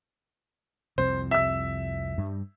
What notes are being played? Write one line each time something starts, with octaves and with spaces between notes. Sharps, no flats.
C2 F2 C3 C5
E5 E6
G2 G3